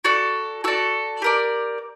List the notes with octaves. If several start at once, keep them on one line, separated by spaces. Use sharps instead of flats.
F#4 A4 D5
F#4 A4 D5
G4 A#4 D5